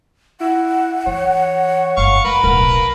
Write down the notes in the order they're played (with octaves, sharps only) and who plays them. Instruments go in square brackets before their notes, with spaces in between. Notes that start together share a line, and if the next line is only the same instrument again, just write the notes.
[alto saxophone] E4 [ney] F#5
[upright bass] E3 [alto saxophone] C#5
[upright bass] G1 F#2 [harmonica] F5 C#6
[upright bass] G#3 [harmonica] A#3 B4
[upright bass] D1 B1 [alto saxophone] A#4